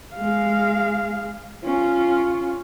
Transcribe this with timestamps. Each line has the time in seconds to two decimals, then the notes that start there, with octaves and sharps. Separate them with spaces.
0.15 G#3 F5
1.64 C#4 F4